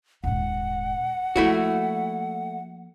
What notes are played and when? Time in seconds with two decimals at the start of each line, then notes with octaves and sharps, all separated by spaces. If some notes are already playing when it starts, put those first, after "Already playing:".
0.24 D#1 G#2 F#5
1.36 F3 A3 A#3 E4 F#4